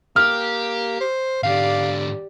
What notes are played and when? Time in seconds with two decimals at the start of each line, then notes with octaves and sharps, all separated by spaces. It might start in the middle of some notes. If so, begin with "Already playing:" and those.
0.16 A#3 G4 F6
1.00 C5
1.43 G#2 D3 G4 D5 F5